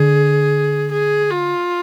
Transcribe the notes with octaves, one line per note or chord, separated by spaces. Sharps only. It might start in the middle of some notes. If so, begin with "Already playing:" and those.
Already playing: D3 G#4
G#4
F4